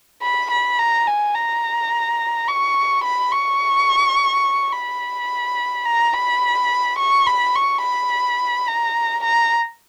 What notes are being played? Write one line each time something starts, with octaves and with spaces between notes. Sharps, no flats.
B5
B5
A#5
G#5
A#5
C#6
B5
C#6
B5
A#5
B5
C#6
B5
C#6
B5
A#5
A#5